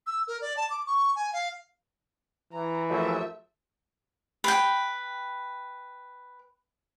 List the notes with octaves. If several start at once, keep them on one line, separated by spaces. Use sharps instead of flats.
E6
A#4
D5
A5
D6
C#6
G#5
F5
E3 A#5
D#2 C#3 F3 F#3 A3 E5
B4 G5